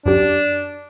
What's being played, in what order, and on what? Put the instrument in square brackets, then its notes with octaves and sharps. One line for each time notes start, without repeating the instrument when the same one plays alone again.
[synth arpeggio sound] F#2 G4 [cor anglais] D4